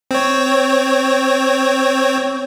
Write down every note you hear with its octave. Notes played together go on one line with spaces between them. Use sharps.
C4 C#5